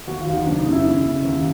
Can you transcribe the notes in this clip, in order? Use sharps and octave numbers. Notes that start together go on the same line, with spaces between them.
D#2 F#4
F4
D#2
D#4
F#1 D4
D#4
C#3
E4
C#3
C#3
D#2